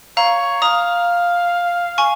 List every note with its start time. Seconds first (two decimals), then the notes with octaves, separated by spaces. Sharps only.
0.17 C#5 F5 A#5
0.62 F5 A#5 D#6
1.98 G#5 C#6